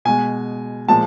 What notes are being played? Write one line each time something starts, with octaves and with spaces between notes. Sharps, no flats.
B2 G#3 G#5
A#2 F3 G#3 A5